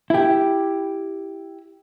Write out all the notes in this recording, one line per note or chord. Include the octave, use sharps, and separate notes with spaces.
E4 G4